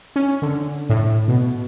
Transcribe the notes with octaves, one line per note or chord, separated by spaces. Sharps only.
C#4
D3
A2
B2